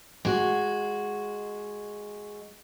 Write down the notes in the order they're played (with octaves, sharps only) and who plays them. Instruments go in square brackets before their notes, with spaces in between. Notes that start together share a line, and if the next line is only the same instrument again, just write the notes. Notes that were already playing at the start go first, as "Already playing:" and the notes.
[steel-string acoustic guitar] G#3 F#4